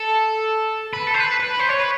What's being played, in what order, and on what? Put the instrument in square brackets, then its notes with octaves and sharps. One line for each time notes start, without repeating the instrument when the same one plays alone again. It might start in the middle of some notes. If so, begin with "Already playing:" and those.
Already playing: [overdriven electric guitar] A4
B4
A4
C5
B4
B4
C5
C#5
B4